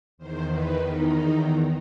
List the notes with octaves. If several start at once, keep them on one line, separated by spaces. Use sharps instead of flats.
E2 D#3 C5
B4
D#4